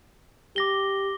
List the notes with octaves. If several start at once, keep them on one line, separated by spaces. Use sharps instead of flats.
G4 D6 A#6 G7